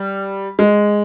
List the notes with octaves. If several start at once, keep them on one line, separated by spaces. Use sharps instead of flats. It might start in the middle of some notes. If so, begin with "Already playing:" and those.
Already playing: G3
G#3